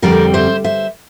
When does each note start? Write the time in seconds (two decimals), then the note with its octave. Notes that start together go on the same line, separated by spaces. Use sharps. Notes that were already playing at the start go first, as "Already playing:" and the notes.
0.02 F2 D3 G3 C4 A#4 D5
0.34 C5 E5
0.64 C5 E5